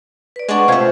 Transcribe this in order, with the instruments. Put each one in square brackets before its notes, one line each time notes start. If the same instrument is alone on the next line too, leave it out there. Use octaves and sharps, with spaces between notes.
[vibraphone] B4 D5
[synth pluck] G#3 D4 [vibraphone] F#5 G#5 C#6
[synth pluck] C3 A3 [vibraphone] F4 [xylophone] C5 F5 G#6